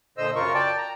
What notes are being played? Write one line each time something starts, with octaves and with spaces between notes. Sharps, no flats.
A#2 D3 C5 D#5 E6
F#2 C#3 F4 A#4 C#6
D5 G5 A5
A#5